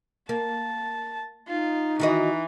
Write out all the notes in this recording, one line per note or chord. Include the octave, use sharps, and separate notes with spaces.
A#3 A5
D#4 F4
D#3 E3 F#4 D#5